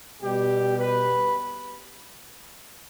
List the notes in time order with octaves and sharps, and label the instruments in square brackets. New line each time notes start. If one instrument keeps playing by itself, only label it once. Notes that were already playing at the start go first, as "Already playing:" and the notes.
[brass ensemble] B2 G3 G4
B4